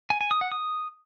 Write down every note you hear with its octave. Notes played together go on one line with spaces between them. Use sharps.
G#5
G#5
D#6
F#5
D#6